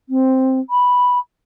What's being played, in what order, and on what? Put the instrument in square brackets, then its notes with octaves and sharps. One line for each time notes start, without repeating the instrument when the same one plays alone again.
[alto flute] C4
B5